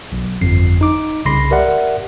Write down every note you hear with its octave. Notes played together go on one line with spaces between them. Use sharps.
B1
G1 F2 C7
D#4 D6
C2 C#3 B5 C6 A#6 C7
G4 A#4 D5 E5 F#5